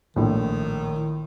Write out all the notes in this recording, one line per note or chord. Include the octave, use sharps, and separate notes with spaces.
A#1 A2 D#3